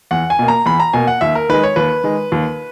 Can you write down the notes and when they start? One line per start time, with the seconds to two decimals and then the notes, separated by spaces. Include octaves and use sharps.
0.11 E2 F#5
0.30 G#5
0.39 B2 A#3
0.48 A#5
0.66 E2 B5
0.80 A#5
0.93 B2 A#3 G#5
1.07 F#5
1.21 D#2 E5
1.35 A#4
1.49 D#3 G#3 B4
1.63 C#5
1.76 D#2 B4
2.04 D#3 G#3
2.32 D#2